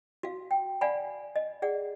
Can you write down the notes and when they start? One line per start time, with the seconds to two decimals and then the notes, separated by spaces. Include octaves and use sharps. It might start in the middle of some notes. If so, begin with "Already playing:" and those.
0.23 F#4 F5
0.51 G5
0.81 D5 F5 F#5 G#5 B5
1.36 D#5
1.62 G#4 D5 F#5